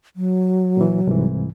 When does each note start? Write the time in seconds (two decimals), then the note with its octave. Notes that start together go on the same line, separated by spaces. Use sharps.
0.16 F#3
0.77 A#2 E3
1.07 C2 G#2 E3